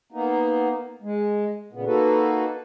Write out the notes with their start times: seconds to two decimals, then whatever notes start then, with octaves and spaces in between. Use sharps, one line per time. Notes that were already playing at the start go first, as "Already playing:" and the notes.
0.12 A#3 B3 D#4
1.02 G#3
1.72 A#2 C#3 B3
1.86 A#3 D#4 F#4 A4 B4